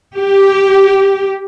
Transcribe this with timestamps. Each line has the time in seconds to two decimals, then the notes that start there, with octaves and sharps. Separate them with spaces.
0.15 G4